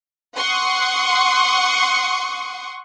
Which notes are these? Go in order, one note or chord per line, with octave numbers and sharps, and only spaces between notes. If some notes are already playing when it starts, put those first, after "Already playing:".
F#5 C6 C#6 D#6